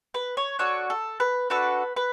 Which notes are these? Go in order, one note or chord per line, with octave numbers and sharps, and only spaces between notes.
B4
C#5
D4 F#4 A4 C#5
A4
B4
D4 F#4 A4 B4
B4